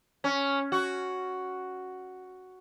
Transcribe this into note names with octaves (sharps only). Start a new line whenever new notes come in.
C#4
F#4